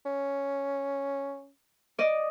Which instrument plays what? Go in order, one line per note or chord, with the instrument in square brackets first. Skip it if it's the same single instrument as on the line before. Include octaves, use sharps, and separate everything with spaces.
[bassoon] C#4
[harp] D5 D#5